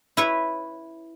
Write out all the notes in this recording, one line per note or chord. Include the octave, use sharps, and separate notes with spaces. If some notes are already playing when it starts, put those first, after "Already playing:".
E4 B4 C#5